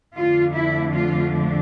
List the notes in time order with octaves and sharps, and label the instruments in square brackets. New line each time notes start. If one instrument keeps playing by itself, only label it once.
[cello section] F2 D3 F3 A3 D4 F4
E4
F4